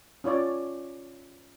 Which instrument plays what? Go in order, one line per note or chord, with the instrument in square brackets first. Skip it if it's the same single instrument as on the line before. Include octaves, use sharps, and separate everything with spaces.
[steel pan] C#4 F4 C#5 D5